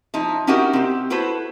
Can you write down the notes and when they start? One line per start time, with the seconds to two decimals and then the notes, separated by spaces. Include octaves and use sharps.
0.14 F3 D#4 E4
0.47 C#4 D#4 E4 F#4 G4 A#4
0.73 C4 G4
1.10 E4 F#4 A4 B4 C5